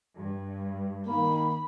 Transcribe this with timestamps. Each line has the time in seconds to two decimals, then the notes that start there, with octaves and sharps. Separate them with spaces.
0.16 G2
1.07 D#3 A#3 B5